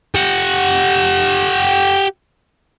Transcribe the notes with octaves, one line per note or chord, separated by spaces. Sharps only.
G4 F#5